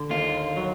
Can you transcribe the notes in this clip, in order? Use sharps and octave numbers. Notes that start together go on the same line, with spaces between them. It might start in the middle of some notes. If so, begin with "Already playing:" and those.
Already playing: D3
D#2 F4
F#3